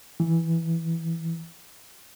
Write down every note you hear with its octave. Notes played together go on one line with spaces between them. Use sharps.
E3